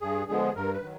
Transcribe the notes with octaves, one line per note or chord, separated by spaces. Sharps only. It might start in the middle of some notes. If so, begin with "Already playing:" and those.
G2 G#4
D3 F3 G#3 B3 G#4
G2 A#4
B4
D#3 F#3